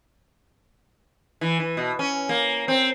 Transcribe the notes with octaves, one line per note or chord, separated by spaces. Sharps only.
E3
E3
B2
C#4
A#3
C4